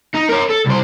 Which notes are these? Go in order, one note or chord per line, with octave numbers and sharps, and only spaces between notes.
D#4
A#4 C#5
A4
C2 C5